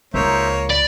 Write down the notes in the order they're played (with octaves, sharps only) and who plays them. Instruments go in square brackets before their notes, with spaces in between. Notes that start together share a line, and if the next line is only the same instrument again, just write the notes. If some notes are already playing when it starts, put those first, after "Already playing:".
[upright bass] C#2 [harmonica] A#3 C#5 [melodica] D#4 C5 E5
[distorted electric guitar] D5 [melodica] B5